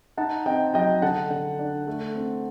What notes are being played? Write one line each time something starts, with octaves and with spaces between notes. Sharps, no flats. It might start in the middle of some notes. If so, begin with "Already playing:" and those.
D#4 F#5 A5
C4 D#5 G5
F#3 D#5 G5
D3 F#5 A5
D3
D4
A3
C4